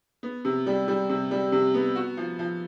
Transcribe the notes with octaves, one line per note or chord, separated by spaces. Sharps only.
B3
C3
G3
G3
C3
G3
C3
B3
F#4
F3
F3